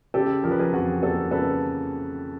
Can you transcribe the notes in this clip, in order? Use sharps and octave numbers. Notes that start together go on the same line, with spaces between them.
C#3 G4 A4
F3 A#4
B4
G#4 A#4
F2 F#4 G#4
A#3 G4 A4
C#3 A4 B4